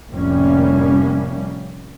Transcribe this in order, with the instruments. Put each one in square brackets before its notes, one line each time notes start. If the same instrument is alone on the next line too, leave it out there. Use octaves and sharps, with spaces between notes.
[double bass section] F1 A2 G3 A#3 C#4